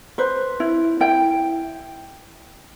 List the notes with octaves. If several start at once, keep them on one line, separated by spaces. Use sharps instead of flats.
B4 C5
E4
E4 G5